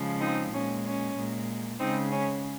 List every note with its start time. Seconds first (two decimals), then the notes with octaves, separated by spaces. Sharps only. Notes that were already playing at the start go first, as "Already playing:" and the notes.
Already playing: C#3 F3 G#3
0.21 C4 D#4
0.53 A#2 G#3 C#4
0.84 C#4
1.16 A#2 G#3
1.80 C#3 G#3 C4 D#4
2.11 C#4